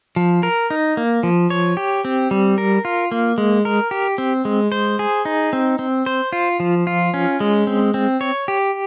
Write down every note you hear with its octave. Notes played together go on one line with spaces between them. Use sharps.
F3
A#4
D#4
A#3
F3
C#5
G4
C4
G3
A#4
F4
A#3
G#3
A#4
G4
C4
G#3
C5
G#4
D#4
C4
C4
C5
F4
F3
F4
C#4
G#3
C4
C4
C#5
G4